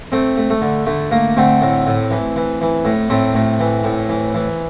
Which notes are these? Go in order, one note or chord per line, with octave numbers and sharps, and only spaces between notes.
A3 C4
A3
A3
D3
D3 A3
A3 A#3
D3 A3 C4
A2
A2
E3
E3
E3
A2
A2 A3 C4
A2
E3
A2
E3
E3